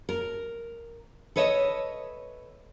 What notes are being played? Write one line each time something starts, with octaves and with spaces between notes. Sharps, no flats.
A#4
A4 B4 C#5 D#5 E5